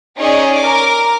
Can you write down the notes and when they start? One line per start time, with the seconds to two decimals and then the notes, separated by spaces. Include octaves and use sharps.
0.18 C#4 D#4 G#4 D5 D#5
0.56 A#4 D6